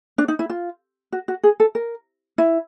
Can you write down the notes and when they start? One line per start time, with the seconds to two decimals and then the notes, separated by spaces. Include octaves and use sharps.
0.18 D4
0.28 D#4
0.39 E4
0.50 F4
1.12 F#4
1.28 F#4
1.43 G#4
1.60 A4
1.75 A#4
2.38 E4